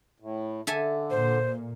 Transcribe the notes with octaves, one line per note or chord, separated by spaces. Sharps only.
A2
D3 A4 E5 G#5
A#2 C5